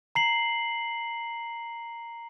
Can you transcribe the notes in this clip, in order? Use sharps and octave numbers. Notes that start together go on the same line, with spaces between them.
A#5 C7 F#7